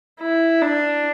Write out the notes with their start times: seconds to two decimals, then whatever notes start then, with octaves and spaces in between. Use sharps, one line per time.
0.20 E4
0.62 D4